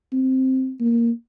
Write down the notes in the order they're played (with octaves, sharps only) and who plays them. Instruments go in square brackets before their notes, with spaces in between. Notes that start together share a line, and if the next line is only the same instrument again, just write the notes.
[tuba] C4
A#3